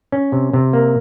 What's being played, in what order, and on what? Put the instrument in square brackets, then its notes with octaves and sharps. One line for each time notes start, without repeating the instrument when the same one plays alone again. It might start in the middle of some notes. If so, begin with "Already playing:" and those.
[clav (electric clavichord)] C#4
C3
C3
A#3